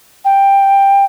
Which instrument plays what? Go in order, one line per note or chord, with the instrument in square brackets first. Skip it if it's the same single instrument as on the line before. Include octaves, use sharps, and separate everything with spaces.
[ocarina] G5